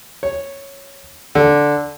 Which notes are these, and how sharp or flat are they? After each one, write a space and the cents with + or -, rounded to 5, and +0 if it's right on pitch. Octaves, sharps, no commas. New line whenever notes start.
C#5 -5
D3 -5